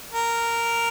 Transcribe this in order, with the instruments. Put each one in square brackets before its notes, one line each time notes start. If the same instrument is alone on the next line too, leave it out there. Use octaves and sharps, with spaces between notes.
[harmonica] A#4